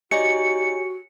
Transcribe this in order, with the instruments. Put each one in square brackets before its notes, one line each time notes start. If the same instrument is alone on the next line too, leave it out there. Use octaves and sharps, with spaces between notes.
[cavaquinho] D#4 D5 C#6 [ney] F#4 [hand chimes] G4 C#5 G#5 [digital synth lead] C#7